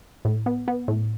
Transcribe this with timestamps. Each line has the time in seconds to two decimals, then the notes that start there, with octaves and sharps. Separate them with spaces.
0.25 A2
0.46 B3
0.68 B3
0.88 A2